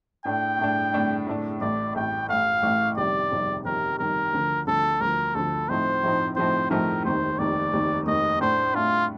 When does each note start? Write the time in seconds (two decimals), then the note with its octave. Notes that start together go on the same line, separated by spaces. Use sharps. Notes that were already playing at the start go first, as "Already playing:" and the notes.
0.25 A2 A3 D4 G5
0.59 A2 A3 D4
0.93 A2 A3 D4
1.27 A2 A3 D4
1.61 A1 A2 A3 D5
1.95 A1 A2 A3 G5
2.29 A1 A2 A3 F5
2.63 A1 A2 A3
2.97 G1 F2 C3 D#3 G3 D5
3.31 G1 F2 C3 D#3 G3
3.65 G1 F2 C3 D#3 G3 A#4
3.99 G1 F2 C3 D#3 G3 A#4
4.33 D2 D3 F3
4.67 D2 D3 F3 A4
5.01 D2 D3 F3 A#4
5.35 D2 D3 F3 A4
5.69 A2 F3 A3 C4 D#4 C5
6.03 A2 F3 A3 C4 D#4
6.36 A2 F3 A3 C4 D#4 C5
6.70 A2 F3 A3 C4 D#4 A#4
7.04 F1 D#2 D#3 C5
7.39 F1 D#2 D#3 D5
7.73 F1 D#2 D#3
8.06 F1 D#2 D#3 D#5
8.40 A2 A3 D4 C5
8.74 A2 A3 D4 F4